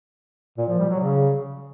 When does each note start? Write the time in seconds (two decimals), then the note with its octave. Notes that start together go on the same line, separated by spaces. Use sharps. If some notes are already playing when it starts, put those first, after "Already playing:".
0.58 A#2
0.69 F3
0.79 G3
0.90 F#3
1.00 C#3